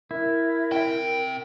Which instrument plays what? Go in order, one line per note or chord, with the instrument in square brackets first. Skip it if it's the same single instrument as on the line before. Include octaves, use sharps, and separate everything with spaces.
[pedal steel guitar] E4 [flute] A#4
[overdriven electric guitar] C3 G5